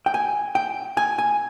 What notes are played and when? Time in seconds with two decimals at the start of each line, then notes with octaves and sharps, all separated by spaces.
0.06 G5
0.14 G#5
0.55 G5
0.97 G#5
1.18 G#5